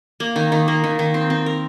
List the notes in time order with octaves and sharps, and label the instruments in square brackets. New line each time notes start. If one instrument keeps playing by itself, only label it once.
[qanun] A#3
D#3
D#3
A#3
D#3
D#3
C4
C4
A#4